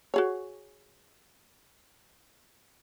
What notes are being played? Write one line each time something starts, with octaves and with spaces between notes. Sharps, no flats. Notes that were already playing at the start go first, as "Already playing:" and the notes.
F#4 G#4 C#5